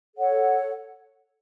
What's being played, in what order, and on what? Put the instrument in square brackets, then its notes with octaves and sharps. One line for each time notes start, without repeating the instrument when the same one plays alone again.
[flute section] A4 C#5 F#5